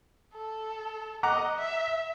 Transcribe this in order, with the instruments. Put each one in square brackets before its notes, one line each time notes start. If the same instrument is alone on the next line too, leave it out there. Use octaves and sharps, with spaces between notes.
[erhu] A4
[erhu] D#5 [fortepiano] F#5 A#5 D6
[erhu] E5